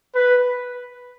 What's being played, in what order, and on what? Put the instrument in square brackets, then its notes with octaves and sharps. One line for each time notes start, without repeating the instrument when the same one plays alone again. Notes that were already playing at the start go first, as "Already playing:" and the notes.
[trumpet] B4